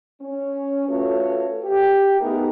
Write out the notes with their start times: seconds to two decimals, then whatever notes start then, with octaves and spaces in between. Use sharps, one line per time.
0.21 C#4
0.88 A3 F4 F#4 A4 B4 C#5
1.64 G4
2.21 A3 B3 D#4 G#4 A#4